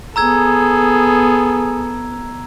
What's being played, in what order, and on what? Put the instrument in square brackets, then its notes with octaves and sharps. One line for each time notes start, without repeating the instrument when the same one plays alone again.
[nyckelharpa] B3 A4 [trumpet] G#4 [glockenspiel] A#5 E6 G#6